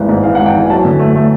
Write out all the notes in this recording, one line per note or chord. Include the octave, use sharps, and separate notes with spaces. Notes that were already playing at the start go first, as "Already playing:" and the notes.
Already playing: G#1 E3
G#2
E3 F5
G#1 F#5
G5
E3 G#5
F#2 A5
D3
A3
A3